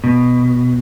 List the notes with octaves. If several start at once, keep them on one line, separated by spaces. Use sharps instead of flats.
B2